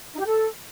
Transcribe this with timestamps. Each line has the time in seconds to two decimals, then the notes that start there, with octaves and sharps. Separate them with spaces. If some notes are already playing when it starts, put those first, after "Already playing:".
0.13 D#4
0.19 G4
0.26 A4